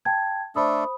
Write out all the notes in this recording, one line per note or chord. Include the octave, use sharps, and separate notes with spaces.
G5 A5 G#6
A3 D4 A4 C5 B5 D#6